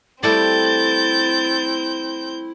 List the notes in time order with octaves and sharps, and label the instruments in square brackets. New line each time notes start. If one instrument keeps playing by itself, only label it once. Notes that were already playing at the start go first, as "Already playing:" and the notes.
[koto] G3 A3 G5 [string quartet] C4 G6 [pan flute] E4 [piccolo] A6